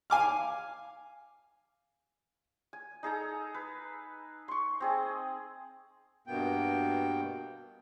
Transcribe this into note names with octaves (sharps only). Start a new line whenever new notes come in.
F5 G#5 D6 F6
G#5
D#4 G#4 A4 A#5
B4
C6 C#6
C4 G#4 D#5
G2 B2 A#3 B3 G5